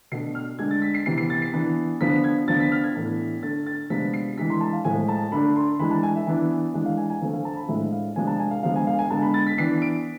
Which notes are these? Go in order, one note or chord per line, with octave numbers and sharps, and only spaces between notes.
B2 A3 D4 C7
F6
D3 G#3 D4 G#6
A6
B6
C7
C3 E3 B3 C7
C7
A6
C7
E3 B3 D4
D3 F3 B3 D4 B6
G#6
D3 F3 B3 D4 A6
B6
F6
G#6
A2 E3 B3 D4
D3 A3 D4 A6
A6
C3 F3 G#3 B3 D4 B6
C7
E3 G#3 D4 B6
C6
A5
F5
A2 F3 G#3 G#5
A5
D3 A3 D4 B5
C6
E3 G#3 D4 B5
A5
G#5
E5
E3 B3 D4
E3 G#3 D4
F5
G#5
G#5
D3 F3 A3 C4 G#5
F5
A5
B5
A2 F3 G#3 D4 E5
F5
C3 F3 G#3 D4 G#5
A5
G#5
F5
D3 F3 G#3 B3 F5
G#5
F5
G#5
D3 G#3 B3 A5
B5
A6
B6
E3 B3 D4 C7
D7